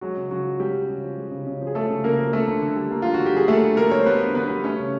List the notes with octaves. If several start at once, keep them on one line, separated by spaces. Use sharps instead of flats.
F#3 G#3 F#4
C#3
C#3 F#3 F#4
F3
G3 G#3 G4
C#3
C#3
F3
G#3
C#3
C#3
F3
G#4
G#3 A3 A4
C#3
C#3 A#3 A#4
F3
A3 A#3 A4
D3
D3
G3
A#3
D3 F4
F#4
D3
G4
G3 G#4
A3 A#3 A4
D3
D3 A#3 A#4
G3 C#5
C5
A#3 B3 B4
D3
D3 B3 B4
G3
A3 C#4 C#5
C#3